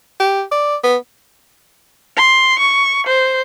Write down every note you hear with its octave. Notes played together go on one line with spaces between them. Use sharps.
G4
D5
B3
C6
C#6
C5